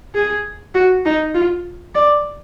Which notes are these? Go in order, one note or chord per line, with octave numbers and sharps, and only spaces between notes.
G#4
F#4
D#4
F4
D5